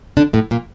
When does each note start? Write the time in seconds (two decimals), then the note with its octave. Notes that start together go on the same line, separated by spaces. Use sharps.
0.17 D3 D4
0.33 A2 A3
0.51 A#2 A#3